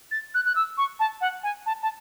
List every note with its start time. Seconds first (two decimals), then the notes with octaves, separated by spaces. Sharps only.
0.11 A6
0.34 F#6
0.45 F#6
0.56 E6
0.78 C#6
1.00 A5
1.21 F#5
1.43 G#5
1.66 A5
1.82 A5